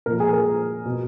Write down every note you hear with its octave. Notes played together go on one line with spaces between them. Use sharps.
A#2 F3 A#4
G#4
A#4
B2